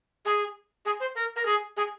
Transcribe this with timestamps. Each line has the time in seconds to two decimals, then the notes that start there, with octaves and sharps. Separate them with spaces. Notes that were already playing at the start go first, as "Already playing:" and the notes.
0.25 G#4
0.85 G#4
1.00 C5
1.15 A#4
1.36 A#4
1.45 G#4
1.77 G#4